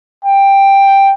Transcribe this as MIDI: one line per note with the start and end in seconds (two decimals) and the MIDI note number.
0.25 1.13 79